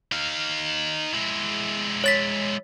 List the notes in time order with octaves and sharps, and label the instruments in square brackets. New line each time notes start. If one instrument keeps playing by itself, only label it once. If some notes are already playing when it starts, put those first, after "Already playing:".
[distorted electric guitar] D#4 F5
G#3 E4
[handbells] C#5 A6 B6